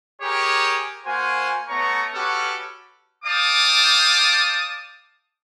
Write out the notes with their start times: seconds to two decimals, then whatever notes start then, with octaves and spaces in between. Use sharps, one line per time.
0.22 G4 G#4 A#4 C#5 D6
1.05 A#3 F#4 C5 G#5
1.68 A3 B3 C#5 A#5 C#6
2.15 C#4 F#4 G4 A4 B4
3.25 D5 F5 G5 A5 D6 D#6